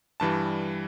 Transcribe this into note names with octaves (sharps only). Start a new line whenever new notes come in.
G2 E3 G3 A5